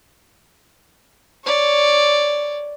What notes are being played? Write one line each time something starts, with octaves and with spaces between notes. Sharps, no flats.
C#5 D5